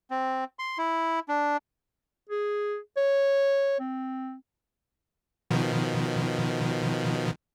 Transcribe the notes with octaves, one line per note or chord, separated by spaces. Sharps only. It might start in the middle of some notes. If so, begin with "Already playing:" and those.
C4
C6
E4
D4
G#4
C#5
C4
B2 D#3 F3